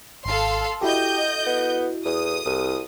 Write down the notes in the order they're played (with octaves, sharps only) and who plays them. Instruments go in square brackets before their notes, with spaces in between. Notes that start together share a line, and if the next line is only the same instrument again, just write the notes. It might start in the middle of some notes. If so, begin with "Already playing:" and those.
[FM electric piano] G#1 [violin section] A4 F5 C6
[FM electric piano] E4 F#4 A4 [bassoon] G4 [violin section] D#5 G6
[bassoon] B3
[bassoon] E2 [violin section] D#6
[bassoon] C2